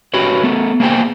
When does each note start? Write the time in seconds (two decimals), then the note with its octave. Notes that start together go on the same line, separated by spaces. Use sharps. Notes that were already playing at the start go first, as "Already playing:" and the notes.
0.14 F#4 G4 B4 C#5
0.43 A3 B3
0.80 A#3 B3 G#4 C5 G5